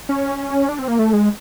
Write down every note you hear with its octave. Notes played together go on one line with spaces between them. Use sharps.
C#4
D4
C4
A#3
A3
G#3